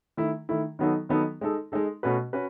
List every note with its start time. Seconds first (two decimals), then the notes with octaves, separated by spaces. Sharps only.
0.17 D#3 A3 E4
0.49 D#3 A3 E4
0.79 D#3 F#3 B3 D#4 A4
1.09 D#3 F#3 B3 D#4 A4
1.41 G#3 D#4 A4
1.72 G#3 D#4 A4
2.03 B2 A3 C#4 F#4 B4
2.33 C#4 F#4 B4